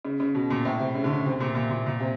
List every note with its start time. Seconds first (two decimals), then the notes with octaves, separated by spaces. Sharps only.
0.05 C#3
0.20 C#3
0.35 B2
0.50 A#2
0.65 A2
0.79 C3
0.95 C#3
1.04 D3
1.10 C#3
1.26 C3
1.40 A#2
1.55 A#2
1.71 A#2
1.86 A#2
2.00 C3